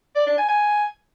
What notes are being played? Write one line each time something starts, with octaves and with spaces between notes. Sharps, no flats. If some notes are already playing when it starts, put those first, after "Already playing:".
D5
D4
G#5
G#5